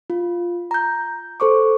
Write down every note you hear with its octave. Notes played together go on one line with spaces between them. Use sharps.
F4
A#5 G6
A4 C5 C#6 D6